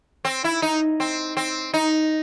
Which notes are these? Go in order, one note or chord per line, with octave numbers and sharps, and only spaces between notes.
C4
E4
D#4
C4
C4
D#4